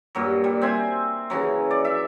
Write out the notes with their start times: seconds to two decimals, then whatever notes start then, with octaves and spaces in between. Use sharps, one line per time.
0.15 G2 A#2 F#3
0.44 G3
0.61 C4 C5 E5 G#5
1.30 C#3 E3 F#3
1.71 D5
1.85 E5